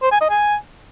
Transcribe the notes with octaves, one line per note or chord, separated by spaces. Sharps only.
C5
G#5
D#5
G#5